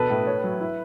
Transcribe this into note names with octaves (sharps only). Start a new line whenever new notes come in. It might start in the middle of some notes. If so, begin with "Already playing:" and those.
Already playing: B2 A4 B4
A2
C#5
F#3
E4